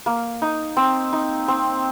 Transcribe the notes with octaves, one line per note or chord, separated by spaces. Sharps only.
A#3
D#4
C4
D#4
C4